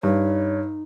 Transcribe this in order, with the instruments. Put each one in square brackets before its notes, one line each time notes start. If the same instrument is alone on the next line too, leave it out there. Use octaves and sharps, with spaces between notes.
[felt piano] G2 [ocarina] D#4 [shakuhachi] C#5